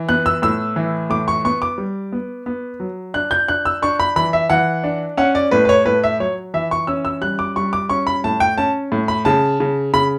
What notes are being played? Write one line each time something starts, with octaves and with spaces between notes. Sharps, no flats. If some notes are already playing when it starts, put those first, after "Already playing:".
Already playing: E3
B3 F#6
E6
A2 E6
E3
A2 D6
C#6
B3 C#6
D6
G3
B3
B3
F#3
D4 F#6
G6
D4 F#6
E6
D4 C#6
B5
E3 B5
E5
E3 F#5
D4
C#4 F#5
D5
A2 B4
B4
C#5
A2 B4
E5
F#3 C#5
E3 E5
C#6
C#4 E6
E6
G3 F#6
D6
G3 C#6
D6
C#4 C#6
B5
A2 A5
G5
C#4 A5
A2
B5
C#3 A5
C#3
C#3 B5